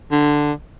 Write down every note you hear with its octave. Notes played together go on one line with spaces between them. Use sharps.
D3